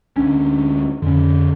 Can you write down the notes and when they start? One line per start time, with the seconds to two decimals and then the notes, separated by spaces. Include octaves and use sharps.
0.16 D2 C#4 D4
1.02 F2 D3 C#4